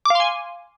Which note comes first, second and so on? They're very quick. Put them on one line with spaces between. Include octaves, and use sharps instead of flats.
D6 F5 C6 G#5